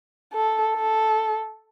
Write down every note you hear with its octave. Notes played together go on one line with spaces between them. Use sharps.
A4
A4